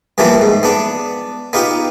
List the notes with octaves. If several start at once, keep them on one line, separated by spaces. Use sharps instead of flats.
G2 E3 F3 G3 A#3 B3
G#2
B3 D4
B3 D#4 F4 G4